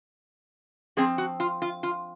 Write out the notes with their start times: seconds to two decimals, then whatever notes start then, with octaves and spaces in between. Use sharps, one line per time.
0.97 F3 C4 G#4
1.18 F#4
1.40 F4
1.62 F4
1.83 F4